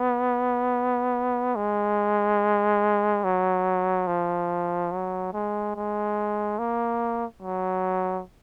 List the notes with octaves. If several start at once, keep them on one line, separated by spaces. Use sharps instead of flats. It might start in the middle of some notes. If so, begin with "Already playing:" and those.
Already playing: B3
G#3
F#3
F3
F#3
G#3
G#3
A#3
F#3